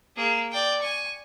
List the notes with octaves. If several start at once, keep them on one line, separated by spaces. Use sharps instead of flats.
A#3 G#4
D5 G5
G#5 C#6